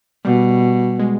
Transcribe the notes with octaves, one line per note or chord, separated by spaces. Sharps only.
B2 G3
G#3